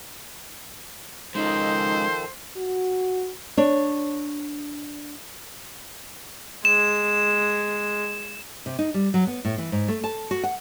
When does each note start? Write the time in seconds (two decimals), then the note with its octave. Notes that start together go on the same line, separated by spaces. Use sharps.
1.35 D#3 F3 G#3 C#4 D#4 A4 C5
2.57 F#4
3.57 D4 C#5
6.65 G#3 E7
8.66 C3
8.79 D#4
8.94 G3
9.14 F#3
9.27 B3
9.45 A2
9.58 E3
9.72 G#2
9.88 A3
10.04 A5
10.31 F#4
10.44 F#5